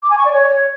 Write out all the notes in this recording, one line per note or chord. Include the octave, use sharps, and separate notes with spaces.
D6
G#5
C#6
D5
C#5